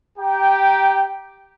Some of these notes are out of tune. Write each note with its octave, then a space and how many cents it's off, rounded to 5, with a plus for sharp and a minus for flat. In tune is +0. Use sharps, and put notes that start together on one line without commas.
G4 +0 G5 -15 A#5 +10